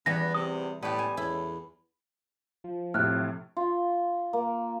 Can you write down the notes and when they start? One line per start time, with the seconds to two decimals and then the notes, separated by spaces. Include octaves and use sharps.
0.06 E2 E3 G3 B3 A#6
0.34 C3 D#6
0.82 A2 G3 B3 G4
0.99 G#5
1.17 E2 A2 E4
2.64 F3
2.94 A2 C3 F6 F#6
3.57 F4
4.33 A#3